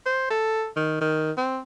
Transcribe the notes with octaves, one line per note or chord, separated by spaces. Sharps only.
C5
A4
D#3
D#3
C4